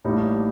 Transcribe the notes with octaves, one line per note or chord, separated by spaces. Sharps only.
A1 A2 G3 A#3 D#4